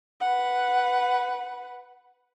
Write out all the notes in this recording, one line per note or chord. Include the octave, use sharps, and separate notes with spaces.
B4 F#5